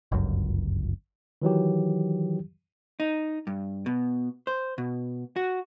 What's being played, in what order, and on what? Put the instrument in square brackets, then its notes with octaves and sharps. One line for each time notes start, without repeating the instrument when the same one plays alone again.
[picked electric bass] G1 C#2 F#2
[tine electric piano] D#3 E3 F#3 G4
[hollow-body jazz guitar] D#4
G2
B2
C5
B2
F#4